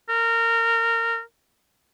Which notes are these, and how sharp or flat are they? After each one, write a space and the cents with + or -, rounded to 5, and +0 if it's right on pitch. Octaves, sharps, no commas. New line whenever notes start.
A#4 -20